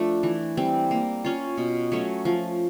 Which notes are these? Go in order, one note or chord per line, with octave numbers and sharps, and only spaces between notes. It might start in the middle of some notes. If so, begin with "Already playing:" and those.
Already playing: F3 A3 D4 F4
E3
G3 C4
A#3
C#4 F4
B2
F#3 A3 C#4
F3